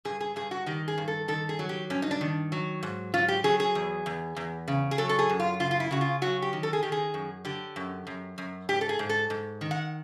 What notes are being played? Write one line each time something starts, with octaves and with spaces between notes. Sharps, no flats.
G2 G#4
G#4
G2 G#4
F#4
D#3 G4
G#4
G2
A4
D#3 A4
G#4
F#3
G4
G2 C#4
D#4
D4
D#3
F#3
G#2
F#3 F4
G4
F#3 G#4
G#4
E2
E2
E2
C#3
G#4
F#3 A4
A4
G#4
F#2
F4
C#3 F4
F4
E4
C#3 F#4
F4
F#3 F#4
G4
D#3
A4
G#4
D#3 G4
G#4
F#2
D3 G4
F#2
F#2
F#2
G#2 G4
A4
G#4
G#2
A4
G#2
D#3
F#5